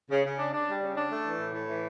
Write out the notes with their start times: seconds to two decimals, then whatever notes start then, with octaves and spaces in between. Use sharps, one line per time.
0.11 C#3
0.25 C#3
0.39 D4
0.54 D4
0.68 G3
0.82 C#3
0.96 D4
1.11 A3
1.24 E3
1.40 A2
1.53 A2
1.68 E3